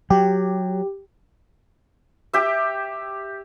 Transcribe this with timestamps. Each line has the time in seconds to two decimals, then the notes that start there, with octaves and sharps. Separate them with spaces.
0.10 F#3 G4
2.33 G4 E5